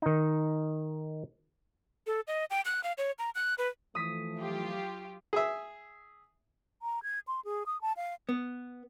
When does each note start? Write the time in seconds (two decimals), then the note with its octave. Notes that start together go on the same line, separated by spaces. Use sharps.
0.02 D#3 D#4
2.07 A4
2.28 D#5
2.51 G5
2.65 F#6
2.84 F5
2.98 C#5
3.19 A#5
3.35 F#6
3.58 B4
3.95 E3 F3 A3 D#6 B6
4.39 F#3 F4 G4
5.33 G#4 E5
6.82 A#5
7.03 G#6
7.27 C6
7.45 G#4
7.66 D#6
7.81 A5
7.97 F5
8.29 B3